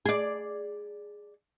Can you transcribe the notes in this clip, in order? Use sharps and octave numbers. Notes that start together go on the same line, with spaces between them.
G#4 D5